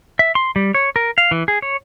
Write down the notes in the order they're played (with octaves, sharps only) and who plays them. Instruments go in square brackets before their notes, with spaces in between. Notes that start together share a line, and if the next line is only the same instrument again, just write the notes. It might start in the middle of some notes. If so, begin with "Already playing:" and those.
[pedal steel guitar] E5
C6
G3
C#5
A#4
F5
E3
G#4
C#5